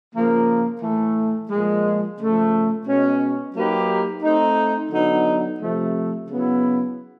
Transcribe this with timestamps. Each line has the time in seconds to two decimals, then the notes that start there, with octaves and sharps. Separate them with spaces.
0.12 C#3 F3 A#3
0.81 A2 E3 A3
1.49 A#2 F3 G#3
2.17 C#3 F3 A3
2.86 B2 G#3 C#4
3.54 F#3 A#3 D#4 G4 B4
4.22 A3 C4 D#4
4.90 D3 F#3 B3 D#4
5.59 C3 F3 A3
6.27 C#3 F#3 B3 E4